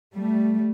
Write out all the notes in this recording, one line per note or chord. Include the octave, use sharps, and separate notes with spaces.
G3 A3